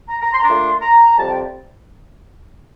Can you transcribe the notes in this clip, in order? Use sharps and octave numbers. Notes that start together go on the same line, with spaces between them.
A#5
A#5
C6
A#5
A#2 A3 D4 C6
A#5
F2 C3 G3 A5
G5